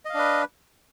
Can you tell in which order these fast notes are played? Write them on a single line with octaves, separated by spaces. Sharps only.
D#5 F5 D4 B4